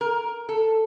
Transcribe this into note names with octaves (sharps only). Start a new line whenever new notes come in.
A#4
A4